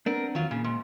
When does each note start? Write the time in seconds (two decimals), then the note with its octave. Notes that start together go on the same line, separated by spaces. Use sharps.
0.06 B3 C4 D4 A#4
0.35 E2 D#3 F#3 F4
0.51 A#2 C#3
0.64 G#2